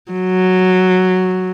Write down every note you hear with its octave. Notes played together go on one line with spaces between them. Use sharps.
F#3